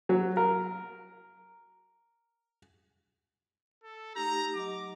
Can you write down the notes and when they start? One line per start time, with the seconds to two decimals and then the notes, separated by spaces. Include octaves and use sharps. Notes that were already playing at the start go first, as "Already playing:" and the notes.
0.09 F#3
0.37 A#4
3.84 A4
4.16 A3 D#4 G4 A#5
4.55 F#3 D#5 D6